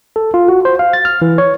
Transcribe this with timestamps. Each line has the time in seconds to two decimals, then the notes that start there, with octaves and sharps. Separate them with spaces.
0.16 A4
0.34 F4
0.48 F#4
0.65 C5
0.79 F5
0.93 A6
1.05 F6
1.22 E3
1.38 C#5